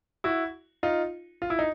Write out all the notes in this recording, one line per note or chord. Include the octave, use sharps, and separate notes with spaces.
E4 F#4
D#4 F4
F4
E4
D#4